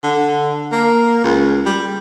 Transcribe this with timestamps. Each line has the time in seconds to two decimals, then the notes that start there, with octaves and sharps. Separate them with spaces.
0.04 D3
0.72 A#3
1.24 C#2
1.66 G3